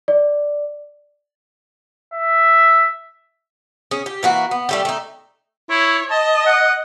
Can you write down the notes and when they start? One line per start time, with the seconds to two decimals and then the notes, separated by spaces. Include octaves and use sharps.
0.08 D5
2.14 E5
3.91 C#4 G#4
4.06 G4
4.23 E3 A#3 F#4
4.51 B3
4.69 G3 A3 G4
4.85 A3 D#4
5.70 E4 C#5
6.10 D#5 A5
6.46 F#5